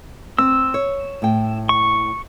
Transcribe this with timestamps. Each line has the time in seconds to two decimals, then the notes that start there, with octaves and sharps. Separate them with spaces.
0.39 C4 E6
0.74 C#5
1.22 A2 G5
1.69 C#6